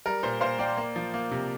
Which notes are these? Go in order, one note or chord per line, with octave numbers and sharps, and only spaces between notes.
G3 A#4
A#2 C5
A#2 C5 F5
A#3 D5 G5
A#3
F3
A#3
C3